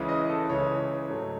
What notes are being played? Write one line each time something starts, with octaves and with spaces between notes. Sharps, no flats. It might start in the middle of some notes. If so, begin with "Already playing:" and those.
Already playing: C#2 C#3 E3 G#3
D#5
A4
C#2 C#3 E3 G#3 C#5
G#2 F#3 A3